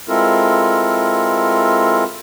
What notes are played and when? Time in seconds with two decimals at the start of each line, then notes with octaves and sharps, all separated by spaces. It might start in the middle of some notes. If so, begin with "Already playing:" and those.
0.08 G#3 C4 E4 F4 A4 A#4